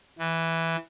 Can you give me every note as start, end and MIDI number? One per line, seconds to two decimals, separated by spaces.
0.19 0.76 52